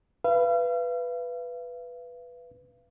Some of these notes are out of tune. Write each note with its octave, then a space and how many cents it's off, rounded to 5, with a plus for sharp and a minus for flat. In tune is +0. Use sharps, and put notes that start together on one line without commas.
B4 +0 F5 -40